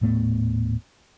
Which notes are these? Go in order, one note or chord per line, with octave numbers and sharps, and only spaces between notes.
D#1 A2 A3 B3